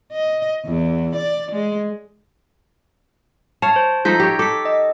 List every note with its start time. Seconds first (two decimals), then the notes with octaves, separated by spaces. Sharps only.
0.12 D#5
0.66 E2
1.16 D5
1.52 G#3
3.62 C#5 F5 A5
3.76 C5
4.05 F3 D#4 A4 G6 B6
4.20 G4 C#5
4.39 A4 D6 B6
4.65 D#5